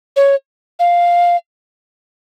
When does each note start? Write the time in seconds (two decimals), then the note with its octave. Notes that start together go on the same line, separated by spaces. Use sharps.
0.16 C#5
0.80 F5